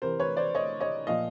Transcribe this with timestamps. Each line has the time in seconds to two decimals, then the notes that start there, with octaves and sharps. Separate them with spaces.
0.02 C3 E3 A#4 C5
0.20 B4 C#5
0.37 C5 D5
0.55 C#5 D#5
0.80 C#5 D#5
1.07 A#2 F3 D#5 F5